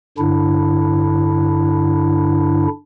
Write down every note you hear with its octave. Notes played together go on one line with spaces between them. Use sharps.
G2 D3 D4 E4